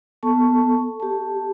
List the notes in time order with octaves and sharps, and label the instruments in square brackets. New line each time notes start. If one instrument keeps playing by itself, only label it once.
[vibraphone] B3 A4 A5 C#6
G4 A5